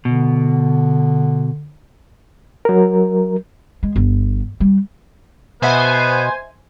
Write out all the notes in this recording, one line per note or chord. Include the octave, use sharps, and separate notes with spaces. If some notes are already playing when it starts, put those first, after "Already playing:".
B2 D3
F#3 A#4
G#3
G1
G3
B2 B3 C5 D#5 E5 F#5 G#5